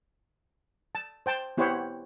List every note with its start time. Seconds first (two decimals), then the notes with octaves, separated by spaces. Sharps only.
0.95 A5
1.26 C5 G5 A5
1.57 B3 E4 G4 C5 C#5 F#5